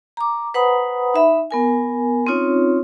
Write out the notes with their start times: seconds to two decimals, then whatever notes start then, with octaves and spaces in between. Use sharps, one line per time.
0.17 A#5 D6
0.54 B4 C5 F#5 A#5 B5 D#6
1.14 D#4 E5 B5
1.51 B3 A#4 G#5
2.27 C4 C#4 D#4 F4 C#5